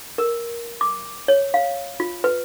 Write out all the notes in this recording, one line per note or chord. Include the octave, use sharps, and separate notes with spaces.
A#4
D6
C#5
F5
F4
B4